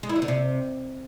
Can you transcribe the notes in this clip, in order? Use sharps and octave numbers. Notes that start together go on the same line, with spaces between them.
G#3
E4
F#3
D3
C3